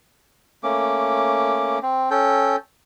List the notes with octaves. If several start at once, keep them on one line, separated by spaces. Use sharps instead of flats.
A3 A#3 C#4 D6
C4
C#4 A4 G5